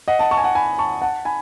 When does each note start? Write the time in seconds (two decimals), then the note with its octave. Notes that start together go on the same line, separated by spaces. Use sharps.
0.08 D#5 F#5
0.19 F#5 A5
0.31 A5 C#6
0.37 G#5
0.43 F#5 A5
0.55 G#5 B5
0.78 A5 C#6
1.02 F#5 A5
1.25 G#5 B5